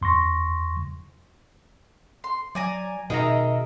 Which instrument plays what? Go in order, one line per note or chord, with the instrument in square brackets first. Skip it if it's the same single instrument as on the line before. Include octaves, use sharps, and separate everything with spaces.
[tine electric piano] E2 C6 C#6 A#6
[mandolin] C6
[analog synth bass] F#3 [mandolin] D5 G#5 A#5
[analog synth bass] B2 [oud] D#3 [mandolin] G#4 E5 A#5